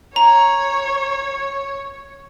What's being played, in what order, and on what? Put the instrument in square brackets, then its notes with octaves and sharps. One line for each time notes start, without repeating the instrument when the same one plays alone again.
[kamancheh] C#5 [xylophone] A#5